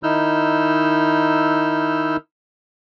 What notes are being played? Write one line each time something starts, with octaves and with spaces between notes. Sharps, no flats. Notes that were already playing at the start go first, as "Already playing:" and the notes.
D#3 D#4 E4 E6 F6 G6